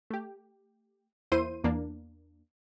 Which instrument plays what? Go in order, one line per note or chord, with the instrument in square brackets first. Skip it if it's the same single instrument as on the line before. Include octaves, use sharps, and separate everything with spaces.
[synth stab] A3 G4
E2 A#3 E4 C5 C6 D#7
E2 A#3 D4